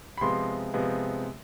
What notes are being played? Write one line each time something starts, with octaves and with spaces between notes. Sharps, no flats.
B5
C3 F3 G#3 B3 C6
C3 F3 G#3 B3